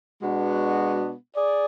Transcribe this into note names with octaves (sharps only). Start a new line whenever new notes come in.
B2 G#3 B3 D4 F#4
G#4 D5